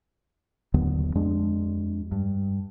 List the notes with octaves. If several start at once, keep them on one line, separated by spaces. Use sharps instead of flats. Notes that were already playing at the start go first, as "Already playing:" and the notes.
D#2 D3 F#3 B3
F2 G#3 D4
G2